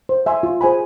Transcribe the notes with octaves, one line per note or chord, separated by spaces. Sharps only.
C5
E5 G#5 C6
F4
G#4 C5 G#5 B5